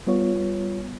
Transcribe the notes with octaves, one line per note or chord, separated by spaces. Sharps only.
G3 B3 F4 C#5